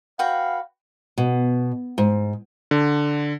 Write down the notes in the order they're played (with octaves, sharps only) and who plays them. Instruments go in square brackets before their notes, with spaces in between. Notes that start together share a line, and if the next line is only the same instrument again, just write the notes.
[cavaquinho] F#4 B4 G5 [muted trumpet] F5
[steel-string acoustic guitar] B2
G#2
[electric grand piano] D3